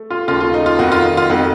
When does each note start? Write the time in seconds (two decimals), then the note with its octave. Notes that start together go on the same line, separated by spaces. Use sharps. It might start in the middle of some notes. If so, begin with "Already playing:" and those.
Already playing: A3
0.10 F4
0.28 D#2 C#3 A3 F4
0.40 F4
0.54 D#4
0.66 F4
0.79 F2 D#3 A3 F#4
0.92 F4
1.17 F4
1.30 F2 D#3 A3 F#4